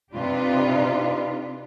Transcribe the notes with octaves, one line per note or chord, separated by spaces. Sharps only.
C3 D4 D#4 F4 G4 B4